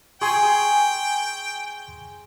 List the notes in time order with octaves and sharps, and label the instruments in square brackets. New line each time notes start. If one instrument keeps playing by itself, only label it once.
[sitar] G#4 [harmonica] G5 [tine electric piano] G#5 C6 C#6